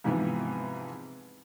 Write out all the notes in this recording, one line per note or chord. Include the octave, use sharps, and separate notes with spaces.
G#2 C3 E3 F3 B3